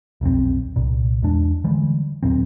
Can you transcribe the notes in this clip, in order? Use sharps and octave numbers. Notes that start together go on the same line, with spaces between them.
D#1 B1 F2 C4
C2 A#2
E2 G#3 D4
D3 E3 G3 G#3
D#2 A#2 F#3 C4